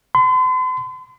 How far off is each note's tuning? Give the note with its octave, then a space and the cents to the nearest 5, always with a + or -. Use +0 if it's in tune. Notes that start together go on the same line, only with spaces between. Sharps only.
C6 -45